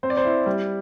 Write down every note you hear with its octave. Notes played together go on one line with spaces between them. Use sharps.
C4 C5
D5
C5
E4
G3